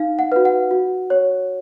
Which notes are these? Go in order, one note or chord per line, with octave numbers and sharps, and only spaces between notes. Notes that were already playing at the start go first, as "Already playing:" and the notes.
Already playing: D#4 F5
F#5
F#4 B4
F#5
F#4
C#5